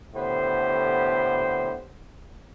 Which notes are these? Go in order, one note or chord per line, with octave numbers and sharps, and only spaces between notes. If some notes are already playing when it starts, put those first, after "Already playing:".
A2 D3 B3 G4 C5